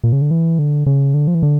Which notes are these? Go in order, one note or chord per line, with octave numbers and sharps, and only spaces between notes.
A#2
C#3
D3
E3
D3
C#3
D3
F3
E3
D3